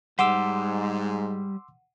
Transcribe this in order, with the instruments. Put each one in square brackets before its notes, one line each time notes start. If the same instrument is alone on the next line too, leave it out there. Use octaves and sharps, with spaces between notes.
[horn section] G#2 [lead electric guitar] G3 [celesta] F#5 [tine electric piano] C6 D6 E6